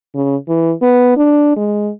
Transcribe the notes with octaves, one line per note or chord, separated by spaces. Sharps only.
C#3
E3
B3
D4
G#3